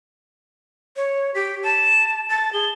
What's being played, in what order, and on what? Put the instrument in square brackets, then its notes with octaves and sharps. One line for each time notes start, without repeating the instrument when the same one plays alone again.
[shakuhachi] C#5
[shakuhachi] G4 [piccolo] B6
[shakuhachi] A5 [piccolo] E7
[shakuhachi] A5 [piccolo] A6
[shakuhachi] G#4 [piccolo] G7